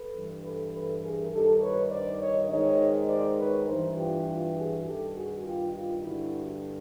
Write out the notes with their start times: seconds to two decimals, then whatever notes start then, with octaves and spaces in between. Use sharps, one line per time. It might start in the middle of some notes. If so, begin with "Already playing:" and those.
Already playing: A4 B4
0.15 G2 E3
0.43 A4 B4
0.73 A4 B4
1.03 G#4 A#4
1.32 G2 D#3 G4 A4
1.61 B4 C#5
1.91 C5 D5
2.20 C#5 D#5
2.50 G#2 D#3 C#5 D#5
3.09 C5 D5
3.38 B4 C#5
3.68 G2 E3 A#4 C5
3.97 F4 G4
4.27 F4 G4
4.57 F#4 G#4
4.85 G2 D#3 G4 A4
5.15 F#4 G#4
5.45 F4 G4
5.74 F4 G4
6.03 G2 D3 E4 F#4